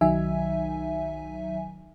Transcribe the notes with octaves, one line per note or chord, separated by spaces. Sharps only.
B1 D#3 F#3 D#4 E5 G#5